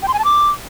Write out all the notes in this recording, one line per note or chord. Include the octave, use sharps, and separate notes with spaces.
G5
C6
G#5
A5
D6